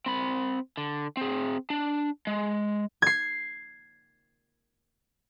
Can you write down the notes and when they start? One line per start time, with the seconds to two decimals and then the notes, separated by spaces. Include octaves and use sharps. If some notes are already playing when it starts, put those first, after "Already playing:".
0.06 C4 B5
0.77 D3
1.17 C4 G#4
1.70 D4
2.27 G#3
3.02 G#6 C7